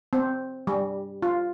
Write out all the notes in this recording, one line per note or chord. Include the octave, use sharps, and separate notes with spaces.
C4
G3
F4